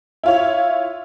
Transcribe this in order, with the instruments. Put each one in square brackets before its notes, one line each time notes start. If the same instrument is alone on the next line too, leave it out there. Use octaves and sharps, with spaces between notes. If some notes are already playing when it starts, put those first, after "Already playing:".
[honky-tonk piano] E4 F4 C#5